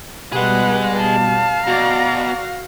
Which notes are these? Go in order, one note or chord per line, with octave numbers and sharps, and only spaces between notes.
B2 G3 G#4 B4 D#5 F#5
F5 A5
B2 F#4 D5 A#5 A#6